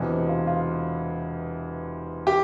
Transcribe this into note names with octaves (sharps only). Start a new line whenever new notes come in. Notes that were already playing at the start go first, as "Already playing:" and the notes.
Already playing: E1 E2 C3
F4
F4
G4